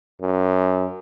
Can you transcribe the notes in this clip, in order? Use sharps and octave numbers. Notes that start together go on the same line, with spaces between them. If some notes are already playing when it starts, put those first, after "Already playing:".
F#2